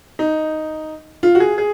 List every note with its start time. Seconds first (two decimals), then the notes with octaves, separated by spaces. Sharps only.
0.19 D#4
1.23 F4
1.35 F#4
1.40 G#4
1.58 G#4